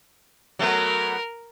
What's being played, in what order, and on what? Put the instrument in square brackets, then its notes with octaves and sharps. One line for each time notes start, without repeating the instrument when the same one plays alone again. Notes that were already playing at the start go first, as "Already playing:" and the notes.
[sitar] F#3 A3 B3 [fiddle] A#4